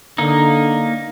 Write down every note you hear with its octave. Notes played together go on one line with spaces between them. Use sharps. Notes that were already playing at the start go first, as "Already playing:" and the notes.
D3 A#3 D#4